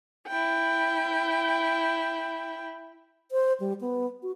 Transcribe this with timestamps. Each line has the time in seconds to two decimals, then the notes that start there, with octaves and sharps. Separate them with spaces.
0.27 E4 G5
3.31 C5
3.60 G3
3.81 B3
4.23 F#4